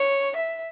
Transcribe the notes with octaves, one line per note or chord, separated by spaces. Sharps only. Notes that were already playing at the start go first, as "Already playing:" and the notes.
Already playing: C#5
E5